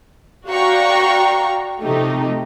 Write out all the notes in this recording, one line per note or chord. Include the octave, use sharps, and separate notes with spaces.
F#4 D5 F5 G5 A#5 C#6
C3 F3 A3 D#4 G4